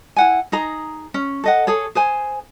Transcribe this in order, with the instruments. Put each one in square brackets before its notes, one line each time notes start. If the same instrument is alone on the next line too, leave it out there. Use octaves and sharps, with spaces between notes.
[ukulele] E4 F#5 G#5
D#4 G#4 A#5
C#4
A4 D#5 F#5
G#4 A4 C#5
G#4 C5 G#5